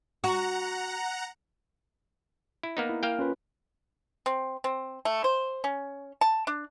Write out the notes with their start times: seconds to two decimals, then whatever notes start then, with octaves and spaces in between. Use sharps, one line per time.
0.24 F#4 F#5 A#5
2.63 E4
2.77 A#3 B3 D#4
2.89 E4
3.03 A#3 F5 G5
3.19 C#4 F4 B4
4.26 C4
4.64 C4
5.05 A3
5.24 C5
5.64 C#4
6.21 A5
6.47 D4